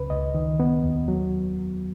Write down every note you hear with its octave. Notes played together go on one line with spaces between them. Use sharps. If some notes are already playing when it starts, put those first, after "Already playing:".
Already playing: C#2 C#3 B4
C#2 D#5
D#3
B3
D#2
F#3